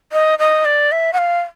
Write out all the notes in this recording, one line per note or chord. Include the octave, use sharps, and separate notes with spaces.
D#5
D#5
D5
E5
F#5
F5